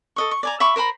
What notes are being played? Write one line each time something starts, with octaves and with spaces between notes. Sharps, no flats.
A4 D#5 C#6
C#6
D5 G#5 A#5
E5 B5 C#6 D6
A#4 C5 A#5 B5